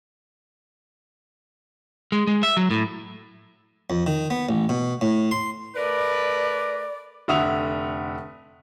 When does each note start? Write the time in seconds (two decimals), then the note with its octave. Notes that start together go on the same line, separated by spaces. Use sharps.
2.12 G#3
2.27 G#3
2.43 E5
2.57 F#3
2.71 A2
3.90 F2
4.06 D#3
4.30 B3
4.49 A1
4.69 B2
5.01 A2
5.31 C6
5.76 A3 A#4 B4 D5
7.28 F1 D3 E5 F#5 D#6 F7